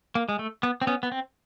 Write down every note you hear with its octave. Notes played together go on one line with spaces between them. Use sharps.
A#3
G#3
A3
B3
C4
B3 C#4
B3
C4